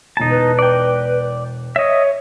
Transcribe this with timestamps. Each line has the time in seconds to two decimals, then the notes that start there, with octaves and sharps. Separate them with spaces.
0.17 E1 D#4 A5 A#5
0.30 B4
0.59 D5 G5
1.76 C#5 D#5 E5